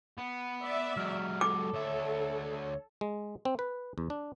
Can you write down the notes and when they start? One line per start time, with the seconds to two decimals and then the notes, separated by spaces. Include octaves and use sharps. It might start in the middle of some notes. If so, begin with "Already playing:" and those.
0.18 B3
0.62 D5 E5
0.97 F#3 G#3 F6
1.41 A4 D6
1.73 D2 C#5 E5
3.01 G#3
3.45 C4
3.59 B4
3.98 E2
4.10 D4